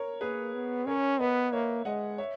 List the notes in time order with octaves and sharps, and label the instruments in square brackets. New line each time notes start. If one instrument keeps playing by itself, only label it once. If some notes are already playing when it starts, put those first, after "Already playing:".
Already playing: [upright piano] A#4 C#5
[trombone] A#3 [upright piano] G#4 B4
[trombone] B3
[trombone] C#4 [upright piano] A#4 C#5
[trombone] B3 [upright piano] B4 D#5
[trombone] A#3 [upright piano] C#5 E5
[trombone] G#3 [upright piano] D#5 F#5
[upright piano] C#5 E5